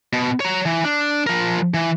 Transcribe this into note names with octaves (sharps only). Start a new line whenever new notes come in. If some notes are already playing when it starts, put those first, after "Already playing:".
B2
C#5 A#5
E3
D4
F3 A#4
E3